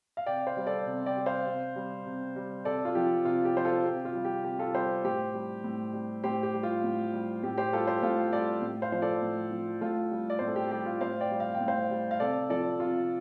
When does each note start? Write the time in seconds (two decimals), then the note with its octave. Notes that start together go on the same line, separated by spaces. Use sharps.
0.17 F5
0.26 C3 D5 G5
0.47 C5 F5
0.57 G3
0.67 A4 D5
0.87 C3
1.06 D5 G5
1.17 G3
1.26 C5 F5
1.46 C3
1.76 G3
2.06 C3
2.36 G3
2.65 C3 A4 D5
2.85 F4
2.95 F3 G4
3.25 C3 F4
3.45 G4
3.55 F3 C5
3.64 F4 A4
3.84 C3 G4
4.05 F4
4.15 G3
4.25 G4
4.44 C3 G4
4.59 F4 A4
4.74 G3 G4 C5
5.04 A2 G4 C5
5.34 G3
5.64 A2
5.93 G3
6.24 A2 G4 C5
6.43 G4
6.54 G3
6.63 F4
6.84 A2
7.14 G3
7.43 A2 G4
7.58 G4 C5
7.73 G3 F4 A4
7.87 G4 C5
8.02 A2 F4 A4
8.32 G3 A4 D5
8.62 A2
8.82 C5 F5
8.92 F3 C5
9.02 A4 D5
9.22 A2
9.51 F3
9.81 A2 F4 A4
10.11 G3
10.30 D5
10.39 A2 C5
10.47 A4
10.56 G4
10.71 G3 G4
10.86 F4
11.01 A2 C5 F5
11.21 D5 G5
11.31 G3
11.40 F5
11.55 G5
11.61 A2
11.68 C5 F5
11.91 G3
12.11 F5
12.20 C3 A4 D5
12.50 F3 A4 D5
12.80 C3 F4